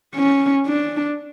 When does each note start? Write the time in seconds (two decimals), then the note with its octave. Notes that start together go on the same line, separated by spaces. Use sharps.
0.15 C#4
0.66 D4